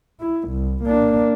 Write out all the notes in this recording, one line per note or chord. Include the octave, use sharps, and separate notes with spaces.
E4
C2
A#3 D4